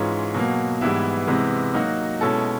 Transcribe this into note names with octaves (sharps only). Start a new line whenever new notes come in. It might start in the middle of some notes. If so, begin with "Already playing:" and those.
Already playing: G#2 E3 G#3 C#4 F4
B2 F#3 A#3
G#2 E3 G3 B3 E4
C3 E3 G#3 B3
F#3 A#3 D#4 F#4
B2 G#3 C#4 E4 A4